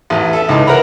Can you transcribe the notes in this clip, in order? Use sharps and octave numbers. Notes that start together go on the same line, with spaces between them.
A1 E2
A4 E5
C#2 E3 D#4 A5
A#4 B4 E5 F#5 A#5 B5